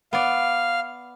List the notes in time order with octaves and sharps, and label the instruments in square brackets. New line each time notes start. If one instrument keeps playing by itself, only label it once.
[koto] B3 D5 [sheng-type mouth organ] F5